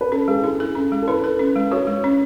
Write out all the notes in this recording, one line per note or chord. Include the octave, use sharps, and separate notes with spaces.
B4
C#4 A4
G#3 G#4
E4 G#4
A4
C#4
G#3
A4
E4 B4
A4
C#4
G#3
F#4 C#5
G#3
C#4